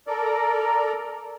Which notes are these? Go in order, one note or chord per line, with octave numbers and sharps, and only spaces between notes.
A4 A#4 D5
A#5